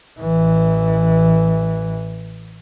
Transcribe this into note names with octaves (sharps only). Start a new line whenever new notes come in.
A1 E3